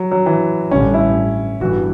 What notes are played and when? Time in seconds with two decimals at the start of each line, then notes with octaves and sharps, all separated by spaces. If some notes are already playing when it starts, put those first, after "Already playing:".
Already playing: F#3
0.11 F#3
0.26 E3
0.71 A1 G2 D3 C#4
0.94 E4
1.61 G1 G2 E3 F#4